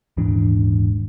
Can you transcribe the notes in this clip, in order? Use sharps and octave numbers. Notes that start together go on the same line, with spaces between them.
D#1 G#2 E3 D4